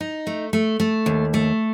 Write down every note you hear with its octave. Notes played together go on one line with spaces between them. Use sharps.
D#4
A3
A3
A3
D#2
A3